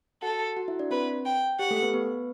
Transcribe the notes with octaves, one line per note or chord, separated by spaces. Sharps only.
F#4 A4 F#5
F#4 F#5
E4 E5
D4 D5
C4 B4 C5
G5
G4 F#5
A3 A4
B3 B4
B3 B4